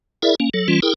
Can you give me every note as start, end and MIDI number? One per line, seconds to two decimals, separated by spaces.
0.23 0.35 64
0.23 0.35 68
0.23 0.35 70
0.23 0.35 74
0.23 0.35 76
0.40 0.49 58
0.40 0.49 61
0.54 0.68 54
0.54 0.68 69
0.68 0.80 52
0.68 0.80 55
0.68 0.80 61
0.68 0.80 65
0.82 0.94 64
0.82 0.94 68
0.82 0.94 70
0.82 0.94 79